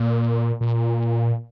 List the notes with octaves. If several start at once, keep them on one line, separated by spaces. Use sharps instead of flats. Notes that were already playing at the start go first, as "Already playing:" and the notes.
Already playing: A#2
A#2